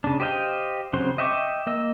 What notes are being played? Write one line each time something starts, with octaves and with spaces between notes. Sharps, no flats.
C#3 D4
G4 C5 D#5 F5 G5
C#3 F#3 C4 C5 C6
D#5 E5 G5 C#6 D6
A#3 D#5 E6